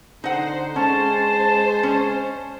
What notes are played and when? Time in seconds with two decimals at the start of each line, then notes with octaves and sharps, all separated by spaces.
0.24 D3 D#4 C5 F#5
0.76 G#3 C#4 C5 A5
1.83 C#4